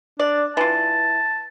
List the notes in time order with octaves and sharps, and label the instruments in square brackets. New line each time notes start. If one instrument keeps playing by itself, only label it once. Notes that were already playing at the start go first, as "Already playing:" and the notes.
[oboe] D4 [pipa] D5
[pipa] E3 F4 [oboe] A5